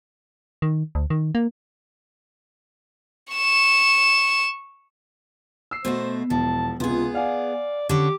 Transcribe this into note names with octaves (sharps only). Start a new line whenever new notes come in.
D#3
D2
D#3
A#3
C#6 E7
E6 C7
B2 A3 F#4 C5
E1 F3 A5
C#2 C3 B3 F4 G#4
D5 F5 F#5 G#5
D3 C#4 G4